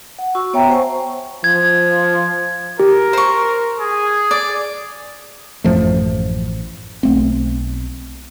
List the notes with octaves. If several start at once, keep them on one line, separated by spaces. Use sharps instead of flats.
F#5
F#4 C#6 E6
B3 C#5 E5 G5 A#5
C5 F#5 G#5 A5 C#6
F3 G#6
G4 A#4
C5 C#6
G#4
D5
A1 F#2 F3 A3
B1 A3 C4